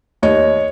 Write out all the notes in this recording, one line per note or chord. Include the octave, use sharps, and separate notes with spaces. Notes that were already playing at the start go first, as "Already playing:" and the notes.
D#2 C#5 D#5